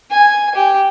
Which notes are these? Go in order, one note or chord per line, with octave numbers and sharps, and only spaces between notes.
G#5
G4